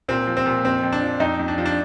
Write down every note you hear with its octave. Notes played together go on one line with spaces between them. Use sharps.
A#2 C4
F3
C4
A#2
F2 C4
F2
D4
F3
F2 D#4
F2
D4
F3
D4